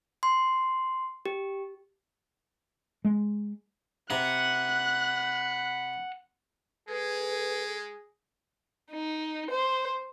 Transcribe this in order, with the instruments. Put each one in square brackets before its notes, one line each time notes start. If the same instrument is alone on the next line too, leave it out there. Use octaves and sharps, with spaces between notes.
[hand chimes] C6
G4
[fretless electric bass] G#3
[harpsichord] C3 A#5 [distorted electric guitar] F#5 [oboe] B5 [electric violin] F#6
[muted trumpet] G#3 [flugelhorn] G#4 [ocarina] A4 [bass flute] B4
[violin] D#4
C5